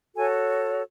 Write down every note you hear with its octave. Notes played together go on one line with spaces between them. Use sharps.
F#4 A4 C#5 G#5